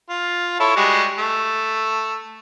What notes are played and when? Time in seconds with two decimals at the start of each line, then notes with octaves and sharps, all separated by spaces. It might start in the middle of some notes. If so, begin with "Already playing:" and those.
0.09 F4
0.60 E4 A4 C#5
0.76 G3 G#3 F#4
1.18 A3